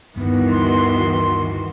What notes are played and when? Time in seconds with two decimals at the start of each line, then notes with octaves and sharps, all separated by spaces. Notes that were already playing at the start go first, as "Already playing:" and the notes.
0.16 D2 G2 D#3 E3 B3 F#4
0.51 C6